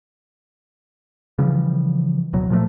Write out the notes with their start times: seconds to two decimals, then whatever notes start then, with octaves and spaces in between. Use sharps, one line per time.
1.39 C#3 E3 F3 G3
2.33 D1 B2 F#3
2.50 A#2 F3 F#3 A3